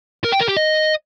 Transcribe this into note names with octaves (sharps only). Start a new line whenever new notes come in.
A#4
G5
A#4
G4
D#5